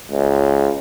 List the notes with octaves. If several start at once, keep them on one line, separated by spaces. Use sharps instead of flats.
C#2